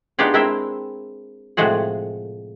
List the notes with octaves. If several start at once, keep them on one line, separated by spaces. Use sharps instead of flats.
B3 D4 D#4 F4 G4 G#4
G#3 C4 E4 A#4 E5 G5
A2 C3 F3 G#3 F#4 G#4